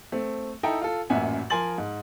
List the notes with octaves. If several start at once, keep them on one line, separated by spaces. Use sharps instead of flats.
A3 C4
D#4 E4 A4 D#5 G5 A#5
F4 A4
A1 F#2 A#2 E5 F#5 G#5
F3 A#4 G#5 C6 A6 F#7
G#2